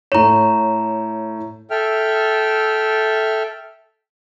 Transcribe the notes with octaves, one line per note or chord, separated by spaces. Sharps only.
A2 C#5 A#5 E7
A4 E5 G5 F6